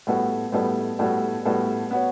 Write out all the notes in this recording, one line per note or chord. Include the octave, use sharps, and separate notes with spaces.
A2 G3 B3 F#4 A4
A2 G3 B3 F#4 A4
A2 G3 B3 F#4 A4
A2 G3 B3 F#4 A4
B3 F#4 C#5